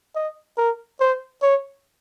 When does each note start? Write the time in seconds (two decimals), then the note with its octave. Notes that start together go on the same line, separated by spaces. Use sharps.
0.15 D#5
0.58 A#4
1.00 C5
1.42 C#5